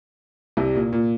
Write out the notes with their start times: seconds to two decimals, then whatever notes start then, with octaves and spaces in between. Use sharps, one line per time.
0.57 C2 C3
0.75 A#2
0.93 A#2